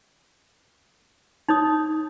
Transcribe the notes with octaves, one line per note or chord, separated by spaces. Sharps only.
D#4 C#5 D#6